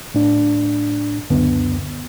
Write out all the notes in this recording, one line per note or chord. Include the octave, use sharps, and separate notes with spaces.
A2 D4
C#2 F#2 D3 B3